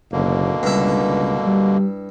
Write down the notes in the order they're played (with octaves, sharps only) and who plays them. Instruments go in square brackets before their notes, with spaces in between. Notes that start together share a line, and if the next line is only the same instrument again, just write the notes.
[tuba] F#1 [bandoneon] B2 D3 A#3
[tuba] C#2 [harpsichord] G2 E4
[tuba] C#2
G3